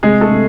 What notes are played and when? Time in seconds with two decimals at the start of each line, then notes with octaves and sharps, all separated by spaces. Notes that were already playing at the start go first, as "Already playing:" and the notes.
0.03 C3 G#3 G#4
0.21 A3 A4
0.31 C3